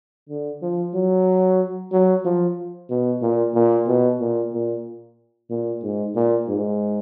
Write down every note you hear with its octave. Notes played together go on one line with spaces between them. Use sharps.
D3
F3
F#3
F#3
F3
B2
A#2
A#2
B2
A#2
A#2
A#2
G#2
A#2
G#2